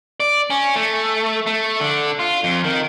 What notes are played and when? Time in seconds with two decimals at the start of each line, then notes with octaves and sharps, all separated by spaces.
0.20 D5
0.50 C#4
0.76 A3
1.46 A3
1.80 D3
2.19 F4
2.44 F2
2.64 D#3